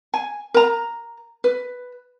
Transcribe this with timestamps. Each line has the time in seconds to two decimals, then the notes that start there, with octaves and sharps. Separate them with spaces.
0.14 G#5
0.54 A#4 A#5
1.44 B4